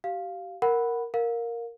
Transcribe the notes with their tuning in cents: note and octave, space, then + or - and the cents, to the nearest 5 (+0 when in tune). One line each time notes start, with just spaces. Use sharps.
G4 -35 F5 +0
A#4 +0 F#5 +0 B5 +0
A#4 +0 F5 +30